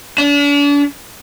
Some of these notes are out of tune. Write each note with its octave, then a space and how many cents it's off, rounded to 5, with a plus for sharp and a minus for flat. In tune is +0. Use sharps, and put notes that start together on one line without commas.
D4 -40